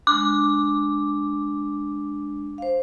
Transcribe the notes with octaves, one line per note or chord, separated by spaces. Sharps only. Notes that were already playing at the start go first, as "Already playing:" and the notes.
G#3 D4 D6
C5 F5